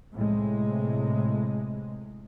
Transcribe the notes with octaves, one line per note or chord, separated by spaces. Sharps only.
A2 C3 G#3